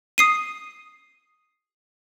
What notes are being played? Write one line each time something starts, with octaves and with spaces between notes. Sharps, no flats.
D#6 C7 D#7